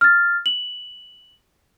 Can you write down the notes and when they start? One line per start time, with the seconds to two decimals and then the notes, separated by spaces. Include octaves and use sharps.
0.01 F6 A6
0.46 F#7